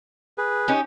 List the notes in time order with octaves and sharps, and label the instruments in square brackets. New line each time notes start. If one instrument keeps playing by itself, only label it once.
[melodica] G#4 B4
[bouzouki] C#4 D#4 G4